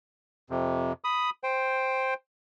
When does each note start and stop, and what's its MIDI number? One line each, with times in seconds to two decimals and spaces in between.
0.50 0.93 41
0.50 0.93 48
1.04 1.30 83
1.04 1.30 87
1.44 2.14 72
1.44 2.14 79